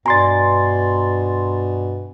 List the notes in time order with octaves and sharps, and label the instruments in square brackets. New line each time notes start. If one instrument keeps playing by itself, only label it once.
[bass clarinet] G2 [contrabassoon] B2 [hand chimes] D5 G#5 [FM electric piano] A#5 C6 A6